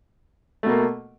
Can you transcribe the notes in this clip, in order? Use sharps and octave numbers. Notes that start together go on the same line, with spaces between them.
B2 A3 A#3